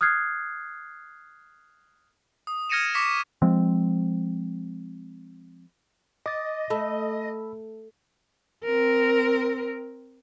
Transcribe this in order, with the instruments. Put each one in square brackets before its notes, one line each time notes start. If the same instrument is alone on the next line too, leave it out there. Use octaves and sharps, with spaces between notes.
[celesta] D#6 F6 F#6 G#6 C7
[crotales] D#6
F6 G#6 A#6 C#7 D#7 E7
C#6 D6 B6 C#7 E7
[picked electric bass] F3 G#3 C4
[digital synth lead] D#5 [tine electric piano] D6 D#6 A6
[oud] A3 [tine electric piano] A5 B5 E6
[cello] C4 A#4